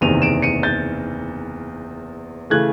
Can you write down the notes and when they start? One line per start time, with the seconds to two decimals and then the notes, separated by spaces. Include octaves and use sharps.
0.01 F#1 E2 C3 D#3 D#7 F7
0.22 D7 E7
0.42 C#7 D#7
0.63 G6 A6
2.50 C#3 E3 A3 F#6 G#6